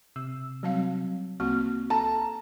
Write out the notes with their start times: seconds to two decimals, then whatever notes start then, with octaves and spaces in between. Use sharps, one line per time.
0.16 C3 E6
0.63 F#3 G3 C4 F5
1.40 C2 A#3 C4 F#4
1.90 A4 A5 A#5